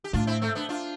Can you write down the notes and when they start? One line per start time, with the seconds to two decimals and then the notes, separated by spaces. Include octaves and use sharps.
0.04 G4
0.13 A2 D4 F4
0.27 C4 E4
0.41 A3 C4
0.55 B3 D4
0.69 D4 F4